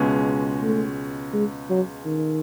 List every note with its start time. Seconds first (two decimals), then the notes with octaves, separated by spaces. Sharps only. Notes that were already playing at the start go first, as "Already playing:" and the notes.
Already playing: C#2 B2 G#3 C#4
0.63 A3
1.33 G#3
1.70 F#3
2.05 D#3